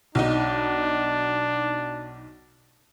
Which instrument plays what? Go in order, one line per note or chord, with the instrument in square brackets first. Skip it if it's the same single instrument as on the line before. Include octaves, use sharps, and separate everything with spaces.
[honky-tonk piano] B1 D#4 [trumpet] D4